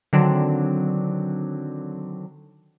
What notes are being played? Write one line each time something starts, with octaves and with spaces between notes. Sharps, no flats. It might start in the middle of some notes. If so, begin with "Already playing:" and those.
D3 D#3 F#3 C4 D4